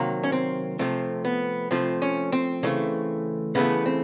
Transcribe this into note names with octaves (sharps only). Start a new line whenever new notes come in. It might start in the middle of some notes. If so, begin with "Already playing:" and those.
Already playing: C3 D#3 F#3 A#3
C#4
C4
C3 F3 A3 C4
B3
C3 F3 A3 C4
C#4
C4
C#3 E3 A3
C#3 E3 A3 B3
C4